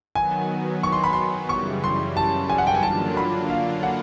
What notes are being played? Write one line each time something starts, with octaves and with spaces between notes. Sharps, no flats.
D#3 F#3 B3 G#5
C#6
C6
B5
C6
F#2 C#3 E3 G3 C#6
C6
A5
G#5
F#5
G5
G#5
D3 F#3 A#3 D4 F4 A5
B5
F5
F#5